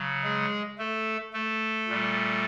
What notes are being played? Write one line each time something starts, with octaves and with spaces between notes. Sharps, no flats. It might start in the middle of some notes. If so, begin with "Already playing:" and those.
Already playing: C#3 F#3
G#3 G#4
A3 A4
A3 A4
A#2 G3